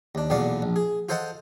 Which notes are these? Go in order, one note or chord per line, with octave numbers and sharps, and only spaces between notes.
D#2 D4
B1 E2 A#2 B3 D5 F5
A#1
G#4
F4 A4 C5 D#5 F#5 A5